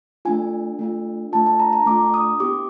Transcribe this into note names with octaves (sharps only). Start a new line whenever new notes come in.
A3 D4 F4 G#5
A3 D4 F4
A3 D4 F4 A5
A5
A#5
A#5
A3 D4 F4 D6
D#6
B3 E4 G4 D6